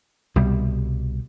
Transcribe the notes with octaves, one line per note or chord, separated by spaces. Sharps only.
C2 B2 G3